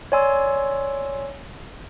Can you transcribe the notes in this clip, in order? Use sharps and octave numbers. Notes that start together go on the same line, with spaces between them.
C#5 D5 G#5 C6 E6